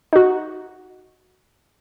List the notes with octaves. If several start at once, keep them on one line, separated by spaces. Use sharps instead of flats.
D#4 F#4